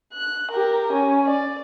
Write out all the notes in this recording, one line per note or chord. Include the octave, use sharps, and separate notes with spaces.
F#6
G4 A#4
C#4
D5